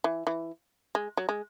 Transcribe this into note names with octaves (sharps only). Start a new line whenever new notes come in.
E3
E3
G#3
F#3
G#3